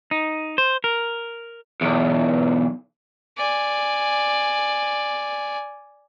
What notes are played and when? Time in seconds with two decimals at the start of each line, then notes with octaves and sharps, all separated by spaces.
0.11 D#4
0.58 C5
0.84 A#4
1.81 B1 E2
3.38 D5 G#5